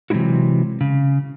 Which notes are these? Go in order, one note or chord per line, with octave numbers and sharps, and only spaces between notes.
C3 E3 F#3 G#3 E4 F#4
C#3